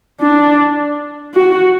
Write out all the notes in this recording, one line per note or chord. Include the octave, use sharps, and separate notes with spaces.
D4
F#4